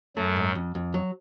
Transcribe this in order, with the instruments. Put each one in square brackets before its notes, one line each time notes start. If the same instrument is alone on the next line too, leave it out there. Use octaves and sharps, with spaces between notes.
[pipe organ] F#2 F#3 [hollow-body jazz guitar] A3
[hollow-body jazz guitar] G#2
F2
F2
F#3